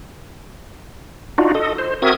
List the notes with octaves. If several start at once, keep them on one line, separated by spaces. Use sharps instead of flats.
D4 D#4 F4 F#4
A4 D#5
C5
C4 F#4 A#4 E5 D#6 G#6